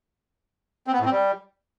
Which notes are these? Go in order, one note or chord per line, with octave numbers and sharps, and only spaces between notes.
C4
B3
A2
C4
G3